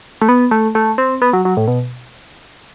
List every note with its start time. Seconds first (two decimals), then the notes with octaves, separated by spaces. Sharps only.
0.22 A3
0.29 B3
0.51 A3
0.75 A3
0.98 C4
1.22 B3
1.33 F#3
1.45 F#3
1.57 A2
1.68 B2